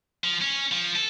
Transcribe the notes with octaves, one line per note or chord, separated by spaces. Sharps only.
F3
C#4
F3
A4